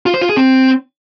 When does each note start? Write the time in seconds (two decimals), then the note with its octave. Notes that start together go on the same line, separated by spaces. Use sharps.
0.06 F4
0.14 C5
0.22 F4
0.29 G#4
0.37 C4